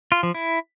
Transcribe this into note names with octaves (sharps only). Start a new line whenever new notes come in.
F4
F3
E4